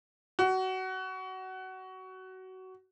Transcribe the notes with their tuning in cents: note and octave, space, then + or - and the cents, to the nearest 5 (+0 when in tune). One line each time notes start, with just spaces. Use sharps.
F#4 +20